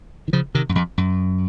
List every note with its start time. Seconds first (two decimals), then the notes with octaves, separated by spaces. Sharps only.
0.28 D#3
0.33 C#3 F3
0.55 C3 D#3
0.69 F#2
0.75 F2
0.98 F#2